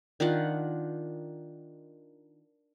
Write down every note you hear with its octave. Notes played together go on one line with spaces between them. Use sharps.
D#3 D4 F4 F#5